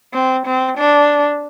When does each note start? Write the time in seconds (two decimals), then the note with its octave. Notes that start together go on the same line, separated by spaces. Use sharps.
0.13 C4
0.46 C4
0.78 D4